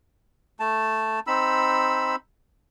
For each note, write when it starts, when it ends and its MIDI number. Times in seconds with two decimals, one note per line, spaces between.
0.60 1.20 57
0.60 1.20 81
1.27 2.16 60
1.27 2.16 63
1.27 2.16 83
1.27 2.16 88